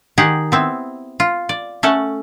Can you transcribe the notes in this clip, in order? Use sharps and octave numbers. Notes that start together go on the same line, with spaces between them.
D#3 G4 G#4 F#5
B3 C4 E4
F4
D5
A3 C#4 A4 F#5